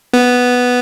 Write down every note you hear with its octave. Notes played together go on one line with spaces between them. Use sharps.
B3